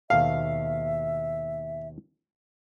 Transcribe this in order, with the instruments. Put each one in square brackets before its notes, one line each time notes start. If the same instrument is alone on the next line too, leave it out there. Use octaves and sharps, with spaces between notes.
[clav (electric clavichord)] D#2 B2 A4 [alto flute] E5 [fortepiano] F5